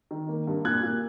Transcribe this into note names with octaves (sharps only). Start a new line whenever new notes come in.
D#3
A#3
G2
A#2 F#6 G#6
A#2